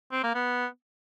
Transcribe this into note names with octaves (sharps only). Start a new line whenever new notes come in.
C4
A#3
B3